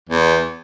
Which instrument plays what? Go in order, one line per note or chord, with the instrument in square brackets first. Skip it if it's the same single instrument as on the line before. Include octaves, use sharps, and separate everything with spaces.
[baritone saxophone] E2